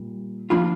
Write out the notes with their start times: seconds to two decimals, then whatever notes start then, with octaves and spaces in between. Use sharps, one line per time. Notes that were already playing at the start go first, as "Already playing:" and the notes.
Already playing: A#2 G3
0.50 F3 A#3 D4 F4 B5